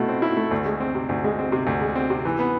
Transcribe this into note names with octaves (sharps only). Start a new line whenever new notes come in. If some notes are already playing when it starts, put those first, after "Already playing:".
Already playing: B2 A3 E4
C4
E4
A3
D2
G#3
C4
C3
D2
G#3
C4
C3
D2
G#3
C4
C3
E3
B3